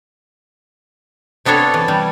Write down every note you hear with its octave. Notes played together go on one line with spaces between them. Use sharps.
C3 B3 D4 A4 C#5 A#5
E3
G3